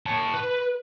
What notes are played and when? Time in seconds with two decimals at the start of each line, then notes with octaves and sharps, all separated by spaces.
0.06 C#5 A5
0.33 B4